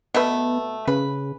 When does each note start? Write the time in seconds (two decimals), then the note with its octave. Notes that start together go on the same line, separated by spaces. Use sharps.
0.14 B2 A3 B3 B4
0.87 C#3 B4